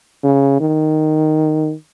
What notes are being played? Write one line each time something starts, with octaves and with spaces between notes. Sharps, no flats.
C#3
D#3